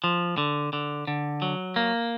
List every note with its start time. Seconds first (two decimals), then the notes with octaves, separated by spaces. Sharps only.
0.04 F3
0.38 D3
0.73 D3
1.07 D3
1.42 F#3
1.76 A#3